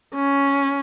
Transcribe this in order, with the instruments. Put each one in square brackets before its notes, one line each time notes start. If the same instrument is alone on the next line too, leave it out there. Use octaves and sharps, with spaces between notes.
[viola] C#4